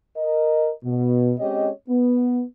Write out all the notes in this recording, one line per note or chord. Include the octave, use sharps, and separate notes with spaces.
A#4 D#5
B2
G#3 C4 C#4 G4 C#5 D#5
B3